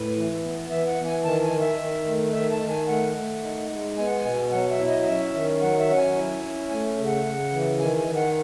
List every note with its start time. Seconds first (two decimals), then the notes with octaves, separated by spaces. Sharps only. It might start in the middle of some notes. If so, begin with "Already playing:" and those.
Already playing: A2 B4
0.15 E3
0.43 B3
0.69 E3 E5
0.88 F#5
0.98 E3
1.06 G#5
1.24 D#3 A5
1.43 G#5
1.52 D#3
1.61 E5
1.79 D#3
2.07 A3
2.34 D#3 E5
2.52 A5
2.61 D#3
2.70 G#5
2.88 A3 F#5
3.15 A3
3.43 D#4
3.70 G#3
3.97 B3 G#5
4.07 F#5
4.17 G#5
4.25 B2
4.52 F#3 F#5
4.70 E5
4.79 E4
4.88 D#5
5.02 D#5
5.07 C#4 E5
5.34 D#3
5.62 F#3 F#5
5.79 E5
5.88 C#4 F#5
5.97 G#5
6.16 E4
6.43 C#4
6.70 A3 G#5
6.97 C#3
7.06 F#5
7.25 C#3
7.52 E3
7.79 D#3 G#5
7.98 G#5
8.06 D#3
8.16 F#5